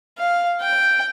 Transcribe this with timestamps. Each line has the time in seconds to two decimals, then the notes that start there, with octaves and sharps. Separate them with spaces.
0.18 F5
0.61 G5